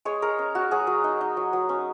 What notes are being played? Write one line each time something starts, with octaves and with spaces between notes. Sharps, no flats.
G#3 C#5
G#3 A#4
C#4
C#4 F#4
F#3 G#4
F#3
D#4
D#4
F#3
F#3
C#4